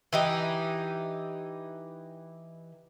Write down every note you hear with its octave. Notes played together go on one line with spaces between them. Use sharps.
E3 D#4 G4